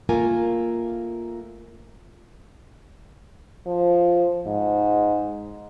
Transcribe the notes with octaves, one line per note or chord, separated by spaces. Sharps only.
A3 A#3 F4 A#4 G#5
F3
G#2